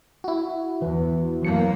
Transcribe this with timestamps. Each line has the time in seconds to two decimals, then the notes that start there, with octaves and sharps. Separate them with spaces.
0.24 E4 F#4
0.82 E2 E3
1.42 F#2 E3 A#3 C#7